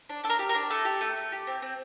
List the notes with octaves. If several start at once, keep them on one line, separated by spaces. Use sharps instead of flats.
D4
D4 A4
A#4
G4
A#4
D4
A3 A4
G4
A3
A3
G4
C4
C4